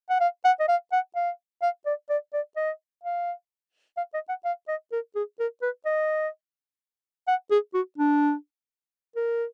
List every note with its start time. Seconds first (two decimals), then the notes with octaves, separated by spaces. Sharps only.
0.10 F#5
0.21 F5
0.45 F#5
0.60 D#5
0.69 F5
0.92 F#5
1.16 F5
1.62 F5
1.86 D5
2.10 D5
2.34 D5
2.57 D#5
3.04 F5
3.97 F5
4.14 D#5
4.29 F#5
4.45 F5
4.68 D#5
4.92 A#4
5.16 G#4
5.40 A#4
5.62 B4
5.86 D#5
7.28 F#5
7.51 G#4
7.74 F#4
7.98 D4
9.16 A#4